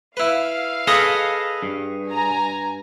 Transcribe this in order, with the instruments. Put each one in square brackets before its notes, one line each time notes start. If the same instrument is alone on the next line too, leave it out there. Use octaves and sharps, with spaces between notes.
[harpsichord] E4 B4 [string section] F5
[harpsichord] G#4 C#5 D#6 [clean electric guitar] A4 B4 D#5
[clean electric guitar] G2
[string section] G#5 A#5